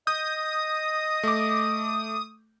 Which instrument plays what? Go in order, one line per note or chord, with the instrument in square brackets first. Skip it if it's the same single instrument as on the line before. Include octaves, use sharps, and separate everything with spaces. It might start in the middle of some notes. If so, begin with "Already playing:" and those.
[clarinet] D#5 [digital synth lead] D#6 [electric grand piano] G6
[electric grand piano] A3 D6